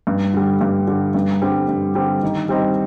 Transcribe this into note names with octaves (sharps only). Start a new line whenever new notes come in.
G2
D3 G3
G2
D3 G3
G2
D3 G3 C4
G2
D3 G3 C4
D#3
G3 C4 D#4